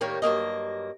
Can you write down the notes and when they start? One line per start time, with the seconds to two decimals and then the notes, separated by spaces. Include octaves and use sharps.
0.01 A2 D#3 G3 A#3 A#4 C#5
0.22 G2 F#3 A#3 D#5